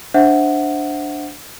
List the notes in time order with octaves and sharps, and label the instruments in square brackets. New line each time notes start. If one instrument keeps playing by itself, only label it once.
[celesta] D4 C5 E5 F#5